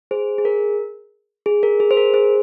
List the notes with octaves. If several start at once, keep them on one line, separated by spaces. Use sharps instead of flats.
G#4 C5
G#4
A#4
G#4
A#4
G#4
C5
A#4
G#4 C5